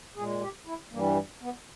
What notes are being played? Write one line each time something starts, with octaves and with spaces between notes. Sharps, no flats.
A#2 G#3 G#4
G4
E4
G2 E3 G3 A#3
B3